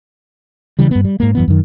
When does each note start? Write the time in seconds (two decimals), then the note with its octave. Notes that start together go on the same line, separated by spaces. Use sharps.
0.79 C#3 E3 G3
0.91 G2 B3
1.05 G3
1.20 G#2 A#3
1.35 F#2 E3 B3
1.48 F#2 D#3